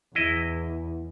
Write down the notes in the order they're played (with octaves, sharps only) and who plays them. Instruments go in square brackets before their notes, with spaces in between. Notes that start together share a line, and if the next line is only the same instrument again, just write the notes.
[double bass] E2 [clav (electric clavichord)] E4 D#5